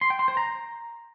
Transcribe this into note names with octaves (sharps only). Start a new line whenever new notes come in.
C6
G5
C6
C5
A#5